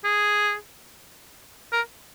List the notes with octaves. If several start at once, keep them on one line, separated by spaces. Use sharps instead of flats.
G#4
A#4